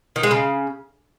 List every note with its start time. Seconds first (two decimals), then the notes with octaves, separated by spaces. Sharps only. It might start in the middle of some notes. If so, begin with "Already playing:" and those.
0.16 D#3
0.23 G#3
0.31 C#3